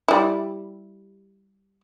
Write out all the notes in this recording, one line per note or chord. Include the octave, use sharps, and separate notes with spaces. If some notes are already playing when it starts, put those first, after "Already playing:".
G3 E4